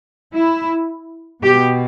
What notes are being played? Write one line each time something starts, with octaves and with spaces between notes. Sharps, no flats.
E4
B2 G4